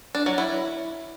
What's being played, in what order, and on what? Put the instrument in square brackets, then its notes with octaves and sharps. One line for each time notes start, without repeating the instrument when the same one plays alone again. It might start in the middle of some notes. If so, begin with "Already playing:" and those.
[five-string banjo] D4
F#3
E4